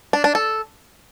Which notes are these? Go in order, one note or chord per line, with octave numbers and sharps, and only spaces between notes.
D4
D4
A4